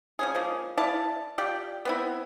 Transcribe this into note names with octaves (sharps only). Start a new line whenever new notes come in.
F3 C#4 G#4
F3 G#3 A#3
E4 D5 F5 A5
F4 G4 D5 G5
B3 C4 E4